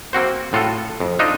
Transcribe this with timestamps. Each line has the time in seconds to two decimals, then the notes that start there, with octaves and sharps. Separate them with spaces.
0.13 A#3 C4 F#4 C5
0.53 A2 F4 F#4 A4
1.00 F2
1.19 D4 D#4 F4 A4 D#5